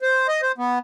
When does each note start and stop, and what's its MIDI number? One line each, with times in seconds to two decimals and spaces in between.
0.02 0.27 72
0.28 0.41 75
0.42 0.52 72
0.58 0.79 59